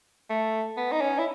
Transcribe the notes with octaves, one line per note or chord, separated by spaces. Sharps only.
A3
B3
D#4
C#4
E4